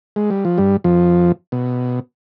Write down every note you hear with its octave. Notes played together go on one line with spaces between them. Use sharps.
G#3
G3
F3
G2 G3
F2 F3
B2